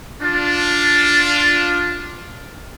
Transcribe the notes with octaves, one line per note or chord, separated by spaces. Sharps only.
D4 F4